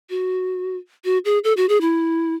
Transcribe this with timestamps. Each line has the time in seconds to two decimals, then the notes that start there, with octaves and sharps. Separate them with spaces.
0.10 F#4
1.05 F#4
1.25 G#4
1.44 A4
1.57 F#4
1.69 G#4
1.81 E4